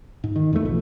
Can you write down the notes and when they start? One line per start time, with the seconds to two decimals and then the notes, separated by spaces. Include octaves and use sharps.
0.24 G#2
0.36 D#3
0.53 F2 E3 F3 A3
0.65 B1 F2